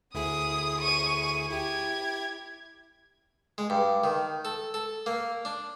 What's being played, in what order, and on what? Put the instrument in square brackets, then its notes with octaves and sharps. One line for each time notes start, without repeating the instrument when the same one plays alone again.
[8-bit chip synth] D2 E4 G#4 [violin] D#6
[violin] C#6 D#7
[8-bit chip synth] E4 G4 [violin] G#6
[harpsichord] G#3
G2
D#3
A4
A4
A#3
D4